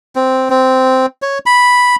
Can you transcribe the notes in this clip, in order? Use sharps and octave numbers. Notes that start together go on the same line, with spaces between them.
C4
C4
C#5
B5